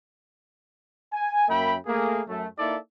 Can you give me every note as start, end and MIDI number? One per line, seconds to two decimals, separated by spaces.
1.13 1.48 80
1.49 1.76 42
1.49 1.76 58
1.49 1.76 76
1.49 1.76 79
1.49 1.76 83
1.87 2.22 57
1.87 2.22 58
1.87 2.22 68
2.28 2.47 42
2.28 2.47 57
2.58 2.77 58
2.58 2.77 63
2.58 2.77 64
2.58 2.77 69
2.58 2.77 74
2.58 2.77 76